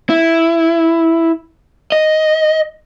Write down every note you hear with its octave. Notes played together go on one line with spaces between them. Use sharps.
E4
D#5